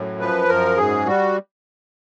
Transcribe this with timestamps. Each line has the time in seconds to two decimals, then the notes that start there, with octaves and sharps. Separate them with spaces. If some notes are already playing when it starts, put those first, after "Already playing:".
Already playing: F#2 A2
0.20 F3 B4
0.48 F#2 A#4
0.77 G#2 G#4
1.06 G3 F#4